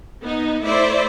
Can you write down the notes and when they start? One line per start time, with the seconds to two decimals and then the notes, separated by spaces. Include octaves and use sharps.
0.23 B3 D#4
0.65 A3 E4 C5 D5 E5